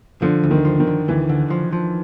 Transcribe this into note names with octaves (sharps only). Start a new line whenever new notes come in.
D3 F3
D2
D#3
F3
D#3
D3
D2 E3
D3
F3
F3